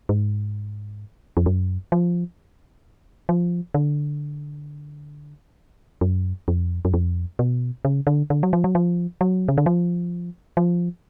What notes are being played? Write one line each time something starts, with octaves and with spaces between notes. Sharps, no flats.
G#2
F2
F#2
F3
F3
D3
F#2
F2
F#2
F2
B2
C#3
D3
D3
F#3
F3
F#3
F3
F#3
C#3
D3
F3
F3